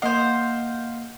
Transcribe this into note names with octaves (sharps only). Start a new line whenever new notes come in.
A#3 C5 D#5 F5 F#5